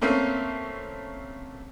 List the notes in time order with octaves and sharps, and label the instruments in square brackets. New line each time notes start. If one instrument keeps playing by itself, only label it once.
[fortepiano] A3 A#3 C4 C#4